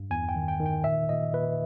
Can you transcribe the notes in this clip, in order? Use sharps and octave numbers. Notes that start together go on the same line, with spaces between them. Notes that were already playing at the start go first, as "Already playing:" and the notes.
Already playing: G2
E2 G#5
G5
D#3
G5
D#3
G5
A#2 E5
A#2 D#5
A#2 B4